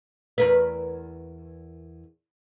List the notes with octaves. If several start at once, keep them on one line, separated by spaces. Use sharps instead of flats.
E2 A#4 B4